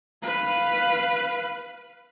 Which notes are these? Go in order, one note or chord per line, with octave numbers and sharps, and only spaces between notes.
B4 F5